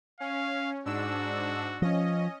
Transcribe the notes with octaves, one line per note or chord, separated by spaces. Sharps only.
C#4 F5
G#2 D4 F#4 E6
F3 C#4 D#5